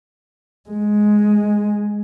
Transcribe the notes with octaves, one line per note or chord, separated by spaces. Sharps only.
G#3